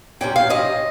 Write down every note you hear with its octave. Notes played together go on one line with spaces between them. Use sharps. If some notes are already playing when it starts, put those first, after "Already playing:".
C3 G3 C#4 G5
F5
C3 G3 C#4 D#5